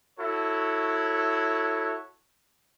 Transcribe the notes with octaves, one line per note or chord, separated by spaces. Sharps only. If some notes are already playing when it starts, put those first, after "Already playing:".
E4 F#4 A4 C#5